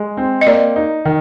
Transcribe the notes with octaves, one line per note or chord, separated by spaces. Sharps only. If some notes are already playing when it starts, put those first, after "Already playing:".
Already playing: G#3
C4
D#5
A#3 D5
D#4
D#3